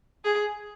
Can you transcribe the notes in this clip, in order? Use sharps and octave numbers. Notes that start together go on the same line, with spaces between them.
G#4